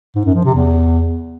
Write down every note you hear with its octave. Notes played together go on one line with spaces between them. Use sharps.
G#2
F#2
F3
C3
E2